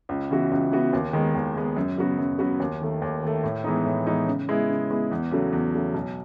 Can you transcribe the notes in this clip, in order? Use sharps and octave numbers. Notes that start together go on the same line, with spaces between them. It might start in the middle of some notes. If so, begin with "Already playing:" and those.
C#2
C#3 E3 B3 F#4
C#2
C#3 E3 B3 F#4
D#2
D#3 G#3 B3
D#2
D#3 G#3 B3
F#2
C#3 F#3 B3 F#4
F#2
C#3 F#3 B3 F#4
D#2
D#3 A3
D#2
D#3 A3
A2
E3 G#3 B3 D#4
A2
E3 G#3 B3 D#4
C#3
G#3 B3 E4 G#4
C#3
G#3 B3 E4 G#4
E2
C#3 F#3 A3
E2
C#3 F#3 A3
B1